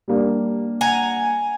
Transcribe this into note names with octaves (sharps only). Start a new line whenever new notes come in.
G3 A#3 D4
F#5 G#5 A#5